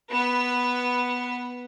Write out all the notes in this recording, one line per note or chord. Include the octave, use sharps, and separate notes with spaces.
B3 B4